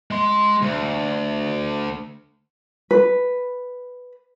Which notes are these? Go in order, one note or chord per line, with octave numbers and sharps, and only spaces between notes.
G#3 C6
D2
B4